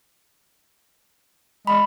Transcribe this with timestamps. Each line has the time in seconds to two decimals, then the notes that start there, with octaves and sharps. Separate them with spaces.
1.67 G#3 B5